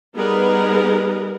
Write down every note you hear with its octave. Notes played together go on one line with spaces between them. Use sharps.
G3 B3 D#4 G#4 A#4 B4